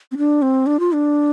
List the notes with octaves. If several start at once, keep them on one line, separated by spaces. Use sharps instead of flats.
C4
D4
C4
D4
F4
D4